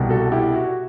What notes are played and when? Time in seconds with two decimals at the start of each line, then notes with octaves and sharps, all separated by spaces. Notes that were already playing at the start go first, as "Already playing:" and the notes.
Already playing: C2 B2 G3
0.09 F#4 A4
0.32 E4 G4
0.54 F#4